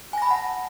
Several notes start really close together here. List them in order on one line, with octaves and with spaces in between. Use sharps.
G#5 A#6 B5 A5 F#5